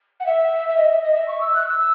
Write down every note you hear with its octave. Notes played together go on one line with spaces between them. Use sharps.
F#5
E5
E5
D#5
E5
D#5
E5
C#6
E6
F#6
E6
E6